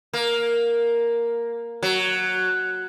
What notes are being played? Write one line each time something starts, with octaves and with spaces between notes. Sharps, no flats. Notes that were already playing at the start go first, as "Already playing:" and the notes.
A#3
F#3